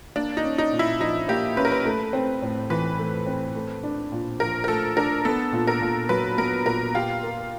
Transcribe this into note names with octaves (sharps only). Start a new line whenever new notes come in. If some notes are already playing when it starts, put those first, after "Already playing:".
A#3 D4
D#4
C#4
D#4
A#2
E4
F3 D#4
A#3 G4
C#4 B4
A#4
B4
A3
C4
A2
E3 B4
A3
C4
A3
D4
A#2
F3 A#4
A#4
A3 A4
D4 A#4
B3 A4
A#2
A#4
A#2
F#3 B4
B3 A#4
A#2 A#4
F4 G4
A#4